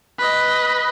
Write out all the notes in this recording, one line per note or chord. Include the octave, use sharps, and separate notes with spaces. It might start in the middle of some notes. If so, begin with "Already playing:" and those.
B4 D#5